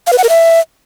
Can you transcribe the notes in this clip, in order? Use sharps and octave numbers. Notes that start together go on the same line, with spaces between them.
F5
B4
F#5
A#4
E5